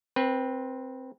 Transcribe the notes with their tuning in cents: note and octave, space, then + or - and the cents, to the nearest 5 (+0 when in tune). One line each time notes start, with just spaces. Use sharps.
C4 +0 B4 -25